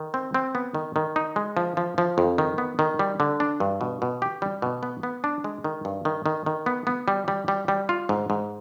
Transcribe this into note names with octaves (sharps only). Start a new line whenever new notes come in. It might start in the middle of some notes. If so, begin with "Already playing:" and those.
Already playing: D#3
C4
C4
B3
D#3
D#3
D#4
G#3
F3
F3
F3
F2
D#3
B3
D#3
G3
D3
D4
G2
B2
B2
G4
G3
B2
B3
B3
D4
G#3
D#3
G2
D#3
D#3
D#3
B3
B3
G3
G3
G3
G3
F4
G#2
G#2